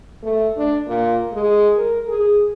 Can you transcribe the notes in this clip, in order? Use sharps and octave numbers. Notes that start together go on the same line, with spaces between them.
A3
D4
A#2
G#3
A#4
G#4